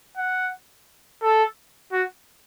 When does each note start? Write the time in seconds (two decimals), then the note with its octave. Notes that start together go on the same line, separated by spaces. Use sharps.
0.17 F#5
1.23 A4
1.92 F#4